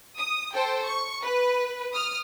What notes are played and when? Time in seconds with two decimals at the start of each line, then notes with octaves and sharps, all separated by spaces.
0.19 D#6
0.55 A4 C5 G5
0.85 C#6
1.23 B4
1.93 D#6 F6